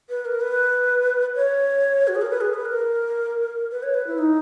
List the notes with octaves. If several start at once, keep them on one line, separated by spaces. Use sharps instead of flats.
B4
A#4
B4
C#5
F#4
G#4
A#4
B4
G#4
B4
A#4
B4
C#5
B4
E4
D#4